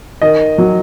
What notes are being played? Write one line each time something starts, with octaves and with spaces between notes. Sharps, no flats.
D#3 D#5
F#3